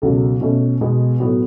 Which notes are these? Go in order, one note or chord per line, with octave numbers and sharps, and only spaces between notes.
C#2 B2 F#3 A4
B2 A3 C#4
B2 G#3 B3
A2 F#3 B3 F#4